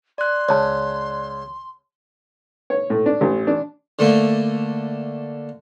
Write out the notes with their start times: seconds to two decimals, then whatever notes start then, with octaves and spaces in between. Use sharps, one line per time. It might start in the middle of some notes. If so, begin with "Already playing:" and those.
0.18 D5 C6 F#6
0.49 C#2 C#5 A5
2.70 C#5
2.90 A2
3.06 D4
3.21 A1
3.47 D4
3.99 D3 A3 A#3